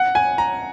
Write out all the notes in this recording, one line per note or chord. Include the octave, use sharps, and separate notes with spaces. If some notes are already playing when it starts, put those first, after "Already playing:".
Already playing: F#5
G#5
A#5